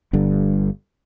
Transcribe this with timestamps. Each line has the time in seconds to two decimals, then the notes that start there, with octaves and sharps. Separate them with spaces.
0.13 G1 G2 D3